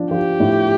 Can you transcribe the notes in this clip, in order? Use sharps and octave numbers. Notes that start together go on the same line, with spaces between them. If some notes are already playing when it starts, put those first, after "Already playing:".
Already playing: F3 D4
F3 G4
A2